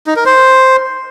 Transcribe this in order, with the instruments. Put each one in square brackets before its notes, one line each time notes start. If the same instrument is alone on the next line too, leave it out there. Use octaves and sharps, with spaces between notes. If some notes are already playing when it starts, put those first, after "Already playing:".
[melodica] D#4
A#4
C5